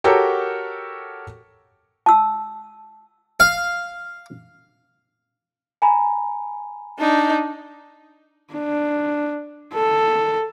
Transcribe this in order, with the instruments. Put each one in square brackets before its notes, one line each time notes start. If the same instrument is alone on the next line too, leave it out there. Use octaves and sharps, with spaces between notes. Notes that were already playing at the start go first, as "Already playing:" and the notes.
[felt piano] F#4 G4 A4 A#4 C#5 G5
[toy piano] A5 E6
[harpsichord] F5
[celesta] G#5 A#5 B5
[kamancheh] D4 D#4
[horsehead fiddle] D4
A4